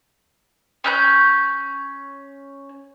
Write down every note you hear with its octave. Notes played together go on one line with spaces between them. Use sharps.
C#4 F#6 G6